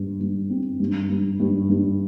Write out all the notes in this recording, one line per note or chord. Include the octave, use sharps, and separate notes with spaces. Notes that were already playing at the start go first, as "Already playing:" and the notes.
Already playing: G2
G2
C4
G2
G2
G2
G2